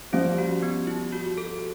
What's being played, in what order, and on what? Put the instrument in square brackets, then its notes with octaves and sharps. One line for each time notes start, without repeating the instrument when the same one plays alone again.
[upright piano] F3 G3 [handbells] C#4
[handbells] F#4
B3
E4
F#4
A4